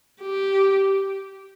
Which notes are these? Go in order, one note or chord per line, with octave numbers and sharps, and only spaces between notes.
G4